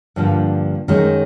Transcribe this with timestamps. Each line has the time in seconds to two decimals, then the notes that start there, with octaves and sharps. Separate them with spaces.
0.16 G2 D3 F3 A#3
0.88 F#2 D#3 G#3